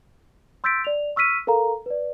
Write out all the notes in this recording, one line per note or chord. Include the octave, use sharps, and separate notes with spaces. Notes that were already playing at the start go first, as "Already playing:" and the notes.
C6 E6 G6 A6 B6 D7
D5 F7
C#6 E6 F6 B6 D#7
A4 A#4 F5 A#5
B4 D5